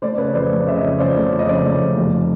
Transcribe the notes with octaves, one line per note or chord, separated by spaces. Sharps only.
A3 C5 D5
C#3 B4 C#5
F2 C5 D5
A3
C#3 E5
C#5 D#5
F2
C#3 C5 D5
A3
F2
D#5
C#3 C5 D5
A3
F2
F1